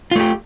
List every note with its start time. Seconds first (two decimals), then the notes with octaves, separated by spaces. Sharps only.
0.11 F4
0.16 A3
0.20 G4